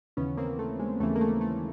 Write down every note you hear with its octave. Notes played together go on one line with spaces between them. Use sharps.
D#2 C#3 E3 B3 C#4
A#3 C4
A3
G#3
D#2 C#3 E3 A3
A#3
A3
A3